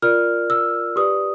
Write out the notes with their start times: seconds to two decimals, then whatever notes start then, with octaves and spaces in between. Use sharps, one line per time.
0.02 F4 A#4 D5 F6
0.50 E6
0.96 G4 B4 D5 D#6